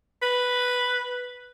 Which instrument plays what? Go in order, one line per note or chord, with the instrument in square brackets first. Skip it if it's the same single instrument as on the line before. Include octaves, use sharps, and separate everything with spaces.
[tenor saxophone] B4